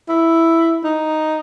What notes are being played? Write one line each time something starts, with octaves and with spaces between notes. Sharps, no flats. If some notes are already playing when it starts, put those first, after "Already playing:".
E4
D#4